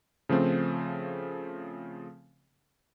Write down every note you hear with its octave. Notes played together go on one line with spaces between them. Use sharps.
C#3 F3 A3 C4